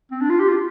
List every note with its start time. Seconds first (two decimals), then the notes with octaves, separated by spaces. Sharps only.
0.11 C4
0.21 D4
0.30 F4
0.40 G4
0.49 F4